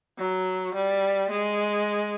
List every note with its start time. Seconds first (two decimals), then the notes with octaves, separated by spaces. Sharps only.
0.18 F#3
0.74 G3
1.30 G#3